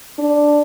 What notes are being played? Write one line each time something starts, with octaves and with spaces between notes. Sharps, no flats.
D4